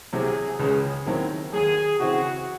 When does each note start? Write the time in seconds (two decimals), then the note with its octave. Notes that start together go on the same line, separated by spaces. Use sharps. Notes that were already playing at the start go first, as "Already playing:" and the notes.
0.13 C2 C3 F#3 C4 G#4
0.59 C#2 C#3 G#3 C#4 G#4
1.06 D#2 D#3 F#3 C4 E4
1.53 D#2 D#3 F#3 G#4
1.99 C#3 E3 C4 E4 F#4 G#4